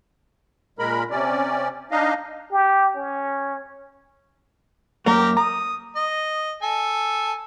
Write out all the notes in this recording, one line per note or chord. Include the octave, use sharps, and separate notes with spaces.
A#2 G#3 A#4 B5
C3 C#4 D5
D4 D#4 D#5 F5
G4
C#4
F#2 A#3 G4 A#4 A#5
A#5 D#6
D#5
A4 G#5